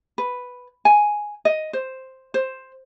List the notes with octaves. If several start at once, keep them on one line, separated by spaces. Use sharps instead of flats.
B4
G#5
D#5
C5
C5